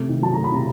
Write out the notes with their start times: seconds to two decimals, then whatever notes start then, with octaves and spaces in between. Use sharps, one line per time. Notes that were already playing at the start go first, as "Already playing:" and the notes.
Already playing: C3 A3
0.09 D#3
0.22 F#3 A5
0.34 A3 A#5
0.44 B5
0.52 C3 A#5